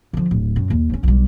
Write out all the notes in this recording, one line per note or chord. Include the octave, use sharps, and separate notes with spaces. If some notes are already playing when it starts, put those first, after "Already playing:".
D3 F3
D1
F#2
D#2
G2 C#4
B1 G3